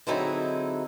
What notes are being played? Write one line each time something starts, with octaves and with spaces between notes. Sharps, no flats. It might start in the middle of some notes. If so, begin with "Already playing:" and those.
D3 F#3 C4 D#4 E4 G#4